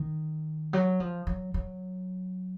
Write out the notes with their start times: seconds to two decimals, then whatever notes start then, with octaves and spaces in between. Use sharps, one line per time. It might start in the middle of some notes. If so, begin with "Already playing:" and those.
Already playing: D#3
0.73 F#3
1.00 F3
1.27 F#3
1.54 F#3